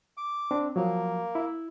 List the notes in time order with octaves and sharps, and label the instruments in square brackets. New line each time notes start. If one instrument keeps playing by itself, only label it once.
[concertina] D6
[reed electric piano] C4 D4
[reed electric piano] F3 F#3 [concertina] A#3
[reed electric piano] E4